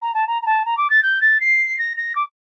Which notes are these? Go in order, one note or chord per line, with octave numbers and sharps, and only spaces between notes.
A#5
A5
A#5
A#5
A5
A#5
D6
A6
G6
A6
C7
A#6
A#6
D6